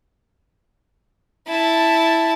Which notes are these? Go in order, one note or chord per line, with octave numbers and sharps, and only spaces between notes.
E4 A5